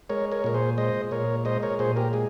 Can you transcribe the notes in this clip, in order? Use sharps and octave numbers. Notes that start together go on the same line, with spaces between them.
G#3 A#4 C#5
A#4 C#5
A#2 A#4
G#4 C5
G#3 C5 D#5
A#2 A#4 C#5
G#3 C5 D#5
A#4 C#5
A#2 G#4 C5
G4 A#4
G#3 G#4